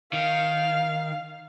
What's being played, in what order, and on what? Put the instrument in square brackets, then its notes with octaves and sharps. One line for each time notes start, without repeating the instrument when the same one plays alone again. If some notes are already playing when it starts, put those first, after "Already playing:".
[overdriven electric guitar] D#3 [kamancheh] F5